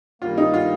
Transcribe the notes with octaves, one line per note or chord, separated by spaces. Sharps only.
G2 D#3 G3 A#3 F4
D#4
F4